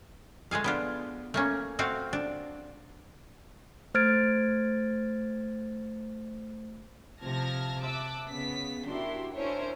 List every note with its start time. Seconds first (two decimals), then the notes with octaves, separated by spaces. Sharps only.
0.51 G#3 A3 G#4 F5
0.64 B3 D4 F4
1.34 A3 A#3 C#4
1.79 A3 C4 F#4 F5
2.13 D4
3.94 A3 C5 F6 G#6 A6 D7
7.22 C3 F3 A5 F6 G#6 A#6
7.81 E5 A5 D6 E6 F#6
8.28 C#3 B3 B6
8.85 D4 E4 F#4 G4 A#4 C6
9.34 C#4 D4 E4 A#4 C5 C#5